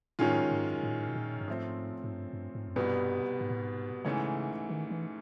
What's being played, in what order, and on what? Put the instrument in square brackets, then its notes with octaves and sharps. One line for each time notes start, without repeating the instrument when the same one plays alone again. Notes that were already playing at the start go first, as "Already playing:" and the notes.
[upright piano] F#2 D#3 G#3 C#4 F4 [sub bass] A2
[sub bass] G#2
A2
A#2
A2
B2
A#2
G2
[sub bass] G#2 [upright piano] F3 A3 C4
[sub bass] G#2
G2
G2
G#2
F#2
[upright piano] C2 B2 G3 B3 [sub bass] G2
[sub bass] G#2
A2
G#2
[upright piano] G#2 E3 A3 C#4 E4 [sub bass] C#3
[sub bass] D#3
E3